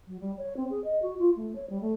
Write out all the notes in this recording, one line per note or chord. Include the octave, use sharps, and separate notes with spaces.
F#3
G3
C#5
C4
G#4
D#5
F#4
F4
A3
C#5
G3
A3